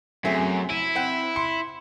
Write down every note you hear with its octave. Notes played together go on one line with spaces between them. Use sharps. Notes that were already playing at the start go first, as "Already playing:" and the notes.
F#2 A3 C4 G#4
E4 D#7
C4 F#5 G5
C6 C#7